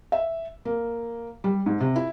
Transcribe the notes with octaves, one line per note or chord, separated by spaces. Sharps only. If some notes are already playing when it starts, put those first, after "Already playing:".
E5
A#3
G3
G#2
C3
E4